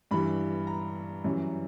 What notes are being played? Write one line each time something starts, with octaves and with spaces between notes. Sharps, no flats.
G2 E3 G3 B5
A#5
F#2 E3 G3